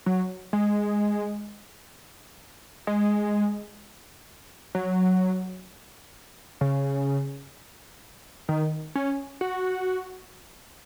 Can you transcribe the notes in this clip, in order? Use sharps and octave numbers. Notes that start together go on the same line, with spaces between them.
F#3
G#3
G#3
F#3
C#3
D#3
C#4
F#4